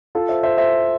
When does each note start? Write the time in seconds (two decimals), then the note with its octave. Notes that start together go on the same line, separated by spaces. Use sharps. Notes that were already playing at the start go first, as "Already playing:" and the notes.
0.15 F4 A4
0.29 C5 E5
0.43 C5 E5
0.57 C5 E5